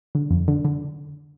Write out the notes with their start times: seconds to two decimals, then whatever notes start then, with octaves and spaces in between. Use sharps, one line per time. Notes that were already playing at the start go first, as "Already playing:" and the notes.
0.15 D3
0.31 F2
0.48 D3
0.65 D3